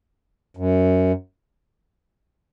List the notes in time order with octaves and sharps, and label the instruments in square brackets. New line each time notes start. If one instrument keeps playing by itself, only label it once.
[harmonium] F#2